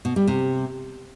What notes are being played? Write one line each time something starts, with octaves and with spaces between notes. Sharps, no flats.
B2
G3
C3